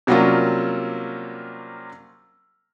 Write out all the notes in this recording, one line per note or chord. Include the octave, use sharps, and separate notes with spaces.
C3 F#3 G3 A#3 C#4 F4